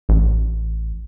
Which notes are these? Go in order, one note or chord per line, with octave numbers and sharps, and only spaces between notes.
A1